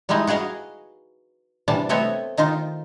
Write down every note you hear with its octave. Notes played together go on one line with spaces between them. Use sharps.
G3 G#3 D#4 E4 D#5
F#4 G#4 B4 D#5 F5
C3 E3 G3 D4 A5
A3 B3 C4 C#5 D#5 E5
D#3 D#4 F4 C5